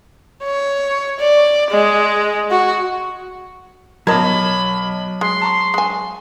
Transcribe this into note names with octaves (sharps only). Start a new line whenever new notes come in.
C#5
D5
G#3
F#4
B1 F#3 A#4 D#5 A5 B5 G#6
G#3 C6
A5 A#5 C#6
G#3 G#5